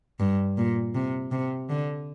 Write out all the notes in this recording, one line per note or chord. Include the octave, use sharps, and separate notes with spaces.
G2
A#2
C3
C3
D3